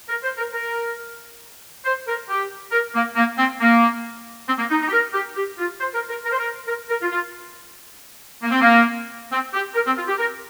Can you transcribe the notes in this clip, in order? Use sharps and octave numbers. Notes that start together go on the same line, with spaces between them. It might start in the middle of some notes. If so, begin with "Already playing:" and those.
A#4
C5
A#4
A#4
C5
A#4
G4
A#4
A#3
A#3
C4
A#3
C4
A#3
D#4
D#4
G4
A#4
G4
G4
F4
C5
A#4
A#4
A#4
C5
A#4
A#4
A#4
F4
F4
A#3
C4
A#3
C4
G4
A#4
C4
F4
G4
A#4